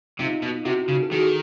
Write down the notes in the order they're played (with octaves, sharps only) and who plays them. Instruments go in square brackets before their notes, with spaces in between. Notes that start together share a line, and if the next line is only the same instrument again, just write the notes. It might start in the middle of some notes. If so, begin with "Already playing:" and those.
[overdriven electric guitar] C3 [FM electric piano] D#4 F4
[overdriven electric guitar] B2
[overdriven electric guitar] C3 [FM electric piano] E4 F#4
[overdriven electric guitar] C#3
[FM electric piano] A4
[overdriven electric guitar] D#3 [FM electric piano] F#4 G#4